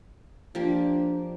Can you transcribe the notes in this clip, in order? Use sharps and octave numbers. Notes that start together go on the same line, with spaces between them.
F3 A#3 D4 G4